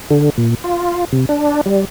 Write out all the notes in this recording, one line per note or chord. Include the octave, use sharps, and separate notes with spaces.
D3
A#2
F4
C3
D4
G3